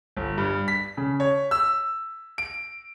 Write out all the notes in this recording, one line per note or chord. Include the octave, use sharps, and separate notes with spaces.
G1
G2
B6
C#3
C#5
E6
D7